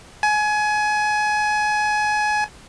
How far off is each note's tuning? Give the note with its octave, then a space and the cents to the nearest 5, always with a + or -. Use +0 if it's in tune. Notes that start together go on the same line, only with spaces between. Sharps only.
G#5 +25